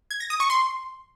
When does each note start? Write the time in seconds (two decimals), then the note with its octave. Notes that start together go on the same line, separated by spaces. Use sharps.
0.11 G#6
0.20 A#6
0.30 D#6
0.40 C#6
0.50 C6